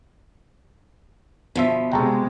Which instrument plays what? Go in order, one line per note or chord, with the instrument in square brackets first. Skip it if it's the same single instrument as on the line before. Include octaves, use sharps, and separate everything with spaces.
[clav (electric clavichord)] G1 F3 E5 [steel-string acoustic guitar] B2
[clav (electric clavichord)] G1 A4 [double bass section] C3 G#3 [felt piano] G5 A#5 C#6